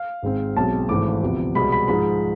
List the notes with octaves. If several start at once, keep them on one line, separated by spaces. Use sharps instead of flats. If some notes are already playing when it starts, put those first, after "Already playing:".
Already playing: F5
G#1 G#2 G#3 C4
B1 B2 G#3 C4 A5
G#1 G#2 E3 A3 D6
D2 C3 F3 B3
C2 B2 G#3 B3 B5
B5
G#2 F3 G#3 B5